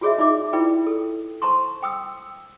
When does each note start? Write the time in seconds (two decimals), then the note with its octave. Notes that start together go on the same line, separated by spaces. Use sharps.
0.01 F4 F#4 G#4 C#5 D#5 E5
0.18 D#4 F4 D5 E5 D6
0.53 E4 F4 B4 D5 G5
0.87 A4
1.42 C5 A5 A#5 C6 C#6
1.83 G5 D#6 E6